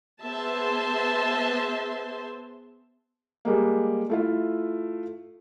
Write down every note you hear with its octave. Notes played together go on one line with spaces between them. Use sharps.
B3 G#4 C5 E5 A5 C6
G3 G#3 A#3
A3 E4 F4